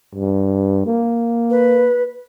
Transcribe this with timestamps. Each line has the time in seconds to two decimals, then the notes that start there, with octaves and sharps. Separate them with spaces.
0.15 G2
0.86 A#3
1.50 B4